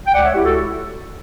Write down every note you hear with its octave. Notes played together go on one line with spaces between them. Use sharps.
G5
C#2 D5 F#5
C#5 E5
C#2 E4 G4
F#4 A4